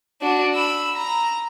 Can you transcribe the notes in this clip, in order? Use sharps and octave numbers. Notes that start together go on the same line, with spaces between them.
D4 F#4
B5 E6
A#5